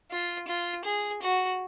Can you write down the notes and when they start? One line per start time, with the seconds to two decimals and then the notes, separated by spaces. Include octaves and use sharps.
0.11 F4
0.48 F4
0.85 G#4
1.22 F#4